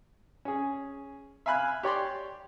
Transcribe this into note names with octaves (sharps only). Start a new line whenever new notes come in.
C#4 G#4
E5 F5 G#5 B5 F#6
G4 C#5 D5 C6